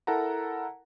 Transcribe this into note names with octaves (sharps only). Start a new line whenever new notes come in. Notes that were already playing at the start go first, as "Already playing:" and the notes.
E4 A4 A#4 F#5 A5 A#5